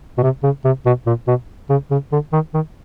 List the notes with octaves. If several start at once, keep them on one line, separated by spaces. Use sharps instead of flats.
B2
C3
C#3
C3
B2
A#2
B2
C#3
C#3
D3
D#3
D#3